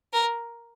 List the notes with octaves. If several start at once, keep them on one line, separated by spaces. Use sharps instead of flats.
A#4